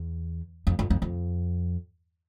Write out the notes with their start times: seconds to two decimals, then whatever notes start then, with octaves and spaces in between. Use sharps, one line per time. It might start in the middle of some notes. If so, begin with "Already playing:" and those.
Already playing: E2
0.67 F2
0.79 F2
0.90 F2
1.02 F2